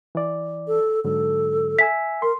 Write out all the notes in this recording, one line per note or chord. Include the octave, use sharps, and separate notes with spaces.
E3 D5
A4
G#2 D3 F#3 A4
E5 G#5 E6 B6
A#4 C6